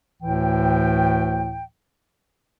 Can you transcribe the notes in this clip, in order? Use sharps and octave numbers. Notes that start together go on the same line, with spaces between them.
D2 A2 E3 G5